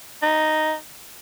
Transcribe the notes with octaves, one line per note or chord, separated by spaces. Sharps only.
D#4